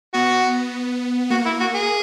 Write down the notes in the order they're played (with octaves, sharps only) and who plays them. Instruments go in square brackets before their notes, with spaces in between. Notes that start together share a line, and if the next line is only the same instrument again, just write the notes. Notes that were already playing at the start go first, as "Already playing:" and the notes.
[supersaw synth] B3 [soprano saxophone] F#4
[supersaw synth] A#3 [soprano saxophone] F#4
[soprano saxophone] E4
F#4
G#4